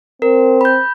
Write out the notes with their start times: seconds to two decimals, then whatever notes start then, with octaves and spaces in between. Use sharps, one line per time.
0.22 C4 A#4
0.61 B5 G6